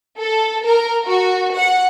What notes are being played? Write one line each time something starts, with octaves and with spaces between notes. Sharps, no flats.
A4
A#4
F#4
F#5